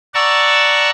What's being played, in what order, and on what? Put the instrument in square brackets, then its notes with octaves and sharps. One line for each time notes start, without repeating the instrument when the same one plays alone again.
[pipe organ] D5 F#5 A5 A#5 C#6 E6